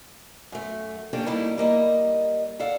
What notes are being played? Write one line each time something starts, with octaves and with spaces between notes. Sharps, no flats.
F#2 A3
A#3 C#4 D4 F4 G4 A4
G3 A#3 D#4 E4
G3 A#3 D#5
A4 D5 F5 F#5